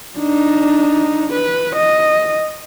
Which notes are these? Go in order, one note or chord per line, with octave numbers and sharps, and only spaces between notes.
D4 D#4
B4
D#5